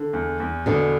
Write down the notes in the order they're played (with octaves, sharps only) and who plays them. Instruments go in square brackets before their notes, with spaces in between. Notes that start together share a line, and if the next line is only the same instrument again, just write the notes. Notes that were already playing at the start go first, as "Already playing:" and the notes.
Already playing: [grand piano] D3
E2
E2
[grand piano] E2 [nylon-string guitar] B2 D3